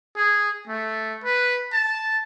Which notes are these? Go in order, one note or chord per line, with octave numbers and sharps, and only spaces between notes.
G#4
A3
B4
A5